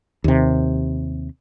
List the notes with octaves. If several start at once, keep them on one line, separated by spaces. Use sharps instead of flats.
D#2 C3